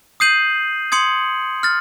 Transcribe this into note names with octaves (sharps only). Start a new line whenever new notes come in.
D#6 G6 C7 D#7 F#7
C6 D#6 G#6 C#7 F#7
F6 A6